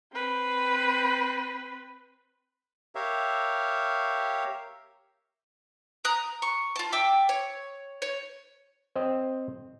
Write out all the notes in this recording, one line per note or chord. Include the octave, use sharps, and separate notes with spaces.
C4 B4
G4 A#4 C#5 E5 F5
A#5 D#6 F#6
C#6
F4 A5
E5 G5 D6 E6
C#5
C#5
C4 C5 D#5 G5